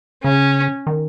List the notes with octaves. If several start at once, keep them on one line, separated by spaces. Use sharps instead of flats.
C#3 C#4
D#3